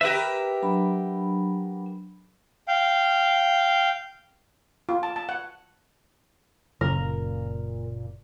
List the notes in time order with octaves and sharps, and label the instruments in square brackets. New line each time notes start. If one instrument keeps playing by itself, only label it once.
[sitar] G4 A#4 B4 [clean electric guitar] E5
[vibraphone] F#3 D4 B5
[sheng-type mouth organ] F5 G5
[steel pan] F4
A5
A5
F#5
[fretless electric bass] F#1 C#3 [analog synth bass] A#2 [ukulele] A#4